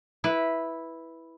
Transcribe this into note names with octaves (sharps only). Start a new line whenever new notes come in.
E4 B4